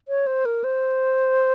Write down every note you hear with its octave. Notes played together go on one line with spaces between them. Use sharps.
C#5
C5
A#4
C5